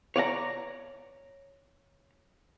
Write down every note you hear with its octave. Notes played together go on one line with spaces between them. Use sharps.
C#5 D5 F5 A#5